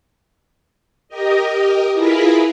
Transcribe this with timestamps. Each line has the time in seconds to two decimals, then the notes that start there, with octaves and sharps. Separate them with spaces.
1.08 G4 A#4 D#5
1.93 E4 F4 G#4 A#4 B4 B5